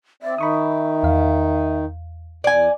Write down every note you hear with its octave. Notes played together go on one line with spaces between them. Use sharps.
C4 D5 E5
D#3 D#4 B5 C#6 D#6
E2 F5
E2 D5 G#5